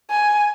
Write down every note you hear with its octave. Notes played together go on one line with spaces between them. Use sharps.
G#5